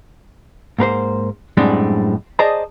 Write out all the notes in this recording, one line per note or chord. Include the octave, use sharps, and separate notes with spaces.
G#2 A#3 B4 C5
F#2 A2 G3 G#3 C4 D4
G#4 C5 D5 D#5 A5 A#5